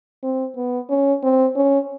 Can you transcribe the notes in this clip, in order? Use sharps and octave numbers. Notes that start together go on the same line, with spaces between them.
C4
B3
C#4
C4
C#4